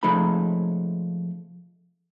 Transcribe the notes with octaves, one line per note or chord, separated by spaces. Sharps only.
C3 F3 G#3 A3 D#4 B5